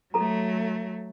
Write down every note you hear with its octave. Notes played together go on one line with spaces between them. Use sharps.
F#3 A3 F#4 A4 A#5